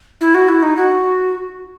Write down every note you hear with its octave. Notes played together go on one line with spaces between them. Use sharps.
E4
F#4
E4
D#4
F#4